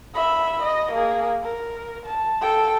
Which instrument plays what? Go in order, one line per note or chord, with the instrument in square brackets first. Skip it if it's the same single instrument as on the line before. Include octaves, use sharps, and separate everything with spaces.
[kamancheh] E5 B5
D#5
A#3 G#4
A#4
A5
A4 G5